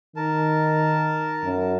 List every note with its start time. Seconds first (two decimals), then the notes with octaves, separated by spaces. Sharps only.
0.16 D#3 A#4 A5
1.44 F#2